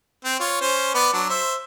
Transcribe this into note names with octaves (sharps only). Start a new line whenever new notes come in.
C4
F4 C#5
C#4 C5
B3 B4 D5
F#3 D4
C5 E5